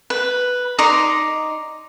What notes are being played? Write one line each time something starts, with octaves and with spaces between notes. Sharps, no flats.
B4
D#4 D5 A#5 C6